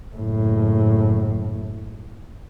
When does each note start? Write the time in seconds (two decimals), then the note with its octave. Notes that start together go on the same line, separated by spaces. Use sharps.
0.16 F#1 A2